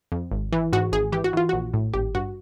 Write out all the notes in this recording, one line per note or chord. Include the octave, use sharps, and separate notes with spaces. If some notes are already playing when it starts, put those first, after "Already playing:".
F2
G#1
E3
G#2 F#4
G#1 G#4
E3 G4
F#4
E3 F4
A#1 F#4
A2
G#1 G4
G2 F#4